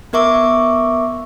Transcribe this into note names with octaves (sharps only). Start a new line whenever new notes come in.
B3 A#4 E5 C#6 D6